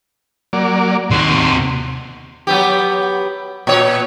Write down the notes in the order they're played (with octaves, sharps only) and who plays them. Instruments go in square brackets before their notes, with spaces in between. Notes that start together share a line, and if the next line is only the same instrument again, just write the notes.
[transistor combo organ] F#3 A#3 D5
[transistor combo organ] D#2 C6 [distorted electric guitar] C3 F#4
[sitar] F#3 B3 G4
A#2 C#5